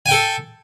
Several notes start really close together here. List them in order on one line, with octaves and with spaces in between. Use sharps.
G#5 G5 A4